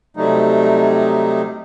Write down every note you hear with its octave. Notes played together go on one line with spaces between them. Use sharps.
C3 F#3 G3 A3 D#4